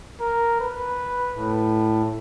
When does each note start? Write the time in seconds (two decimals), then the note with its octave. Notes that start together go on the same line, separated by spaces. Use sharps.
0.20 A#4
0.60 B4
1.33 A2